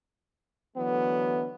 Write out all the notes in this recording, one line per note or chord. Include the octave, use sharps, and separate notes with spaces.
D3 E3 F#3 A3 B3